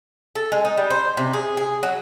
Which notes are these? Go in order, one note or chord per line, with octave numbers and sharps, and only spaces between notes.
A4
G#3
D#4
G3
C5
C3
G#4
G#4
F#3